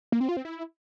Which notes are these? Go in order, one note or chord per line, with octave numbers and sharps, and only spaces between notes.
A#3
C4
F4
C4
E4